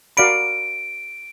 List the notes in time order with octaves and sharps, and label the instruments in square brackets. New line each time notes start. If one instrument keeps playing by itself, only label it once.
[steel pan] F#4 A#4 D5 F5 B5 [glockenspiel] D7